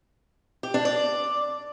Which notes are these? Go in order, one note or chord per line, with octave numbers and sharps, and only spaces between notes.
G4
D4
D5